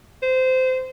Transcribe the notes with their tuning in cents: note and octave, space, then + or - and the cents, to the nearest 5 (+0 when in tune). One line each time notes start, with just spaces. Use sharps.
C5 -20